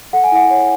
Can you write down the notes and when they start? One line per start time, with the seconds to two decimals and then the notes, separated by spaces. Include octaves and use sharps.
0.13 A4 F#5
0.24 G#5
0.32 E4 F#5
0.50 C#5